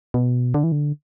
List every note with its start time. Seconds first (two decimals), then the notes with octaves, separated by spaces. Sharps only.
0.14 B2
0.54 D3
0.64 E3
0.72 D3